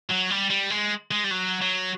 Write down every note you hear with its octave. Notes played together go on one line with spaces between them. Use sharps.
F#3
G3
G3
G#3
G#3
G3
F#3
F#3